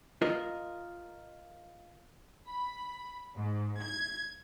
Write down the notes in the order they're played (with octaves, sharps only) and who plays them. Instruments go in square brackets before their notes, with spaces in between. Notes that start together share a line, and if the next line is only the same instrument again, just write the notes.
[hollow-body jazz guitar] F4 A#4 D#5
[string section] B5
G#2
G#6